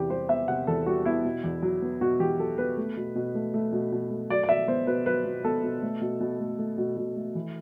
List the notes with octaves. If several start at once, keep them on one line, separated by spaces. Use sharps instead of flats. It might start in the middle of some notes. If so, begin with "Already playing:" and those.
Already playing: E2 C3 G4
G3 C5
B3 E5
C3 F#5
E2 A4
G3 F#4
B3 E4
B2
E2
F#3
B3
B2 F#4
E2 G4
F#3 A4
B3 B4
A3
B2
B2
A3
A3
B2
B2
A3
F#3 D5
D5
B2 E5
B3 C5
B2 B4
F#3 B4
B2
B3 A4
B2
A3
B2
B2
A3
A3
B2
B2
A3
E3